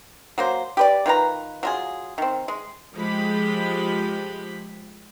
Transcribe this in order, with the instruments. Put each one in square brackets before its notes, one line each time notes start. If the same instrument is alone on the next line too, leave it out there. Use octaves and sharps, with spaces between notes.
[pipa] F#3 A#3 C5
G4 B4 D5
D#3 F4 B4 A#5
F#3 F4 G#4
D#3 C4
G#3
[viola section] F3 G#3 G4 B5